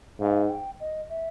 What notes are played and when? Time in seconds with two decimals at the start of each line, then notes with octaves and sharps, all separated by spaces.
0.19 G#2 F5
0.46 F#5
0.50 G5
0.80 D#5
1.09 E5